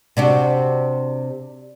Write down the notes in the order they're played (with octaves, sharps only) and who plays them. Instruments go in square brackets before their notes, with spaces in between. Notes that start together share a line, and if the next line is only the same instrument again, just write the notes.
[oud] C3 D4 F#4